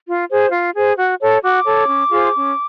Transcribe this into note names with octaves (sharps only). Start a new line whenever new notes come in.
F4
G#4 C5
F4
G#4 C5
F#4
A4 C#5
F#4 D6
A4 C#5
C#4
F4 G#4 C5
C#4